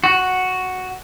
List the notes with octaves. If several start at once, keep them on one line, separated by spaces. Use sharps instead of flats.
F#4